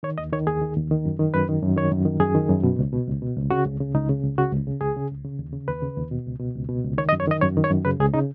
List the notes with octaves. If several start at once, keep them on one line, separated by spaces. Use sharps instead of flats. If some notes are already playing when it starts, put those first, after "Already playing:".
D#3 C#5
D#2 D#5
D#3 C#5
D#2 G#4
D#3
D#2
D#3
F#2
D#3
F#2 B4
D#3
F#2
D#3 C#5
F#2
D#3
F#2 G#4
D#3
F#2
B2
C#2
B2
C#2
B2
C#2
C#3 F#4
C#2
C#3
C#2 D#4
C#3
C#2
C#3 F#4
C#2
C#3
C#2 G#4
C#3
C#2
C#3
D#2
C#3
D#2 B4
C#3
D#2
B2
C#2
B2
C#2
B2
C#2
D#3 C#5
D#5
F#2
C#5
D#3 D#5
F#2 C#5
D#3
C#5
F#2
C#3 B4
C#2 G#4
C#3 D#4